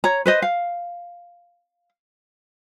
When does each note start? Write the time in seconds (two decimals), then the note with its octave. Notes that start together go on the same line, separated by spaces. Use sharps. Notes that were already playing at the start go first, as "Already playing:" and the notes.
0.04 C#5 A#5
0.26 B4 C5 D#5
0.42 F5